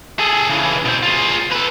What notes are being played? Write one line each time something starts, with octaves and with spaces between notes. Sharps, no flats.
G#4 A4
C#3 E3
B2 C4
F4 G#4
A4 B4